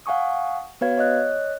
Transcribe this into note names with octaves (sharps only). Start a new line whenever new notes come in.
F5 F#5 G#5 C#6 D#6
B3 F#4 B4 C#5 F5 G#6
C#5 D#5 F#6